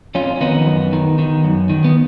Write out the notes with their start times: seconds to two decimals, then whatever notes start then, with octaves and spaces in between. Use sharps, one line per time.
0.15 F2 C#4 F4
0.36 C#4
0.41 D#3 B3 D#4
0.66 F#2
0.93 D#3
1.19 D#3
1.44 F#2
1.69 D#3
1.84 B3